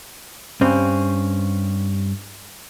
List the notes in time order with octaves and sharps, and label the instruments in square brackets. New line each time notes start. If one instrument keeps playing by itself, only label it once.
[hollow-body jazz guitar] G2 C4 C#4